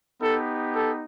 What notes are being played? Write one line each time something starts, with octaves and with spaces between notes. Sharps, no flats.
B3 D#4 G4 A4
A4